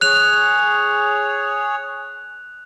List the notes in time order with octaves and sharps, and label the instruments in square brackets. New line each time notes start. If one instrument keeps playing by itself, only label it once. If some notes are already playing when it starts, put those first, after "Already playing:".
[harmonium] G#4 C#5 [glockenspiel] F#6 F7